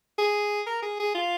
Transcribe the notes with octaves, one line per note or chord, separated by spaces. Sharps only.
G#4
A#4
G#4
G#4
F4